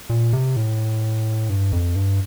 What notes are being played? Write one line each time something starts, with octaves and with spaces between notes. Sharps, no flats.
A#2
C3
A2
G2
F2
G2